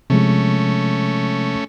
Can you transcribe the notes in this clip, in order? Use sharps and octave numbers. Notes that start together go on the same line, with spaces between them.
C3 F3 G#3 A3 C#4